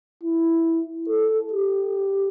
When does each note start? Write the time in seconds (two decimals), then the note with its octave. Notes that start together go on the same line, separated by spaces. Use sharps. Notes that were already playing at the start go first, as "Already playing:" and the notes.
0.23 E4
1.09 A4
1.53 G4